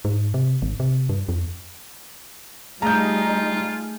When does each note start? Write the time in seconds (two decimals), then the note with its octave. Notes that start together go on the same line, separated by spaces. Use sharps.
0.05 G#2
0.34 C3
0.62 G#1
0.80 C3
1.09 G2
1.29 F2
2.82 G3 A3 D#4 F4 G#4 F5 A#5 G6